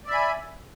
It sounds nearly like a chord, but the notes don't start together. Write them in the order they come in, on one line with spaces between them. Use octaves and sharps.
D5 E5 B5 G#5